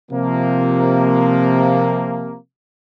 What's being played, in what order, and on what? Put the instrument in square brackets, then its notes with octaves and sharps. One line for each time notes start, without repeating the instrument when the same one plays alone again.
[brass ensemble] C3 F3 A#3